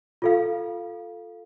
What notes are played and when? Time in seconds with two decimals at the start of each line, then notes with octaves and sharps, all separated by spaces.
0.22 F4 A4 F5